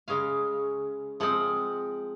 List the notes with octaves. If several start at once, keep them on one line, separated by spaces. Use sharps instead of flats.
C#3 G#3 C#4 F5
F3 G#3 C4 F#5